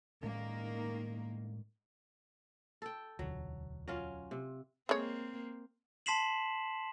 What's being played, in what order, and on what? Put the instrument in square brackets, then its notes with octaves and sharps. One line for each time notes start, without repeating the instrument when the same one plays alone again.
[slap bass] A2 G#3 C#4 [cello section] D#3 A#3
[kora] A4 G5
[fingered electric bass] E1 D2 [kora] F#3
[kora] F#3 C#4 F4
C3
[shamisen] G#3 C#5 [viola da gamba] A#3 C4
[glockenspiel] A5 C6 B6 C7 E7 F#7